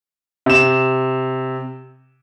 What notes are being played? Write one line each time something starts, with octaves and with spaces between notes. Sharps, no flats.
C3 E7